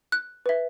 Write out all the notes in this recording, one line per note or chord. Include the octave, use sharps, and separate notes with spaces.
F#6
B4 E5